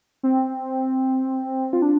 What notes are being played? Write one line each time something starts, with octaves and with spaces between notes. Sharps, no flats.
C4
F4
D4